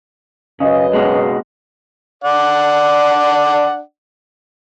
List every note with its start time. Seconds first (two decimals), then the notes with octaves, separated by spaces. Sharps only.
0.60 F#2 C#3 B4 D#5
0.93 C#2 B2 G#3
2.24 D4 D5 F#5